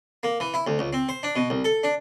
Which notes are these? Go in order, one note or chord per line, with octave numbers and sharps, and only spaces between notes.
A#3
E3
E4
D2
C#2
C4
C5
D4
B2
C2
A4
D4